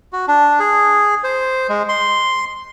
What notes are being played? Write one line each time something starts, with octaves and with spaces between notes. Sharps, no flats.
F#4
D4
G#4
C5
G#3
C6